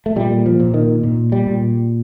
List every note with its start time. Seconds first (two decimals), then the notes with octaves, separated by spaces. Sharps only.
0.06 A3
0.16 A#2 G3
0.46 F3
0.60 A#2
0.74 D#3
1.03 A#2
1.32 G3
1.47 A#2